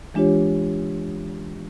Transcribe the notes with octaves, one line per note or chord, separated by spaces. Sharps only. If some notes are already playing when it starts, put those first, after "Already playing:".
E3 G#3 D4 F4 G4 C#5